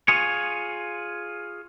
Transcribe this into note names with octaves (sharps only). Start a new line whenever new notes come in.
F4 G#4 C#5